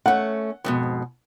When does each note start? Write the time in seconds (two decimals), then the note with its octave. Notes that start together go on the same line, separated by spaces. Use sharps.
0.06 A3 C#4 F#5
0.64 F2 G#2 B2